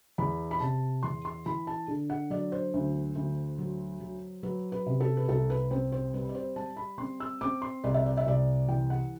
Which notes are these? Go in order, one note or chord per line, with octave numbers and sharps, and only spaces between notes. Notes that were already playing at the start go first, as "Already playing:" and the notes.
E2 B5
B5
C3 A5
E2 C6
C6
E3 B5
A5
D3
F#5
F#3 D5
C5
D2
D2
F#3
F#3
F#3 B4
B4
C3
A4
B4
C2 A4
B4
C4 C5
C5
G3 B4
D5
C5
G3 A5
B5
C4 C6
E6
C4 D6
C6
C2 D5
E5
D5
E5
C2 D5
E3 G5
F#5